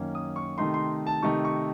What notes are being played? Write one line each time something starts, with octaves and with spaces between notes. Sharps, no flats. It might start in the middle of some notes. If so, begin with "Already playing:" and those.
Already playing: F#2 D#3 A#3 C#4
D#6
C#6
C3 D#3 A3 D#4 C6
C6
A5
C3 D#3 A3 D#4 C#6
C#6